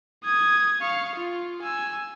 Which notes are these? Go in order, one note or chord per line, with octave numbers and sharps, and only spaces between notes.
D#6 G#6
F5 C#6
F4
G#5 E6